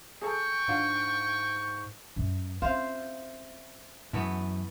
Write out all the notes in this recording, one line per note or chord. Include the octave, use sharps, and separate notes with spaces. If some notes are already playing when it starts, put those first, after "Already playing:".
G#4 A4 G5 C#6
G#2 D4 F4 F#5
F#2
C4 C#4 F4 C5 E5 F5
F#2 E3 A3 B3